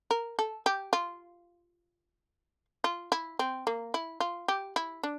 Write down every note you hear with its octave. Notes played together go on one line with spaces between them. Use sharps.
A#4
A4
G4
F4
F4
E4
C4
A#3
E4
F4
G4
E4
D4